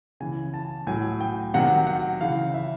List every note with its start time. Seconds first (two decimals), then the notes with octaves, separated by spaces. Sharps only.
0.20 C#3 E3 G#5
0.54 A5
0.87 A2 F#3 G#5
1.20 G5
1.54 C3 D#3 F#3 F#5
1.87 F#5
2.21 C#3 E3 F5
2.54 E5